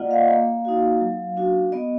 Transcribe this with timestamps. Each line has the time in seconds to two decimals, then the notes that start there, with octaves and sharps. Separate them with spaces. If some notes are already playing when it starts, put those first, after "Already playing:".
Already playing: A#3 F4 D5 D#5 F#5
0.11 F5
0.29 A#3
0.65 D#4 F#4
1.01 F#3
1.37 D4 F#4
1.72 B3 D#5